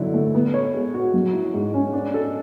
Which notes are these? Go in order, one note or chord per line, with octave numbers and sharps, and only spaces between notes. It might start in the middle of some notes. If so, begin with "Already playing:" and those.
Already playing: D3 F#3 E4
A3
B3
C#5
G#3
F#4
F#3
E4
G#2
C#4
D4
A4